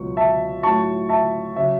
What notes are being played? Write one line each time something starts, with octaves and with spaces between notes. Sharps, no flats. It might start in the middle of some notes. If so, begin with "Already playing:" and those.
Already playing: C#2 B2 F#3 C#6
E5 A5
A2 F#3 A5 C#6
E5 A5
C#3 F#3 E5